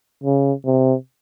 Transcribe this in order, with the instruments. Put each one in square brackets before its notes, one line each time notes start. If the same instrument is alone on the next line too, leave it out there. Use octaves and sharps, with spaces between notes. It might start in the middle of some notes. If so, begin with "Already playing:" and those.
[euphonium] C#3
C3